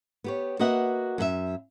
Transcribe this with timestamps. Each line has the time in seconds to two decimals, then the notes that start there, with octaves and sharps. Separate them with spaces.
0.24 B3 G4 C#5
0.59 A#3 F#4 B4 D#5 E5 F#5
1.18 F#2 A4 E5